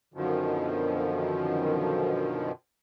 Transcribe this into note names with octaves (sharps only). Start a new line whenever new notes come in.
F#2 B2 D3 D#3 F3